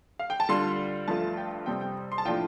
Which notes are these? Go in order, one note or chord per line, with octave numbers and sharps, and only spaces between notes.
F5
G5
A5
D3 G3 F4 C6
G2 F3 A3 F4 A5
G5
F2 C3 G3 C4 G5
G5
C6
A5
A2 F3 D4 F4 G5